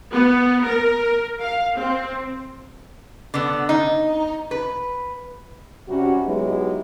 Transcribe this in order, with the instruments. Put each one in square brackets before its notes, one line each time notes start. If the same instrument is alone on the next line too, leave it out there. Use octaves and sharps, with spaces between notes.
[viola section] B3
A#4
F5
C4
[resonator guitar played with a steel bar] D3 B3
D#4
B4
[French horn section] C3 G3 C#4 F#4
F#3 G#3 B3 D#4 E4 G4